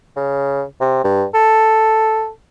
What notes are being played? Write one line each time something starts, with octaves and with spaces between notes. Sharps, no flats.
C#3
C3
G2
A4